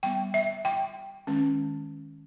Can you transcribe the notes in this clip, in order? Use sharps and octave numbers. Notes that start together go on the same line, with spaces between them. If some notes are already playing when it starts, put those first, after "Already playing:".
G3 B3 G5
E5
G5
D#3 G#3 C#4